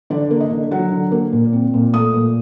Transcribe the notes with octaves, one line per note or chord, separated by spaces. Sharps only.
D3 D5
A#3
D#5
D3
F#3 F#5
D3
A#3
A#2
C4
A#2
A3 D#6
A#2